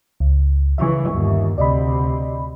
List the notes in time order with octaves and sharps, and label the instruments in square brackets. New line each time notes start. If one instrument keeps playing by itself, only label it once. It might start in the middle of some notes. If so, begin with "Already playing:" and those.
[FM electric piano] C#2
[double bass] C#3 E3 [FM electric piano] E5 C#6
[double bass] G1 D#2
[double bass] D2 C3 [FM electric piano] D5 D#5 B5